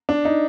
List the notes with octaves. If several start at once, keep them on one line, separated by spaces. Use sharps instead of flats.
D4
D#4